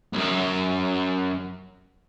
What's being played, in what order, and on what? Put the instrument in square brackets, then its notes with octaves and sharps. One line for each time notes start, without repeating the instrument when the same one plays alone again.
[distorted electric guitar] B1 F#2